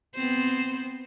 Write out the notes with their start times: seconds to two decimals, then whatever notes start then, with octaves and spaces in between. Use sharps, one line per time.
0.15 B3 C4 C5